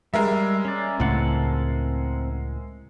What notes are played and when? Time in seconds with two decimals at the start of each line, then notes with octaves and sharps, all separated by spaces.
0.14 G3 G#3 A#4 E5
0.65 C#4 D5
1.00 C#2 A2 C4 F#5 A5